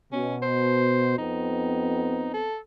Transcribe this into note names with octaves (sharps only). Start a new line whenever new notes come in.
B2 C#4
C5
F2 B3 C4 D#4
A4